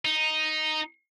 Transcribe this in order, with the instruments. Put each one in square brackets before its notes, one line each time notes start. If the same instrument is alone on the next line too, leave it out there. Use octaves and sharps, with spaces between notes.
[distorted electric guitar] D#4